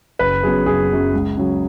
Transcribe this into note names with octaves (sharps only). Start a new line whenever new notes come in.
F#1 B4
F#2 F#3 B3 G#4
F#1 G#4
F#2 F#3 B3
C#2
C#3 F#3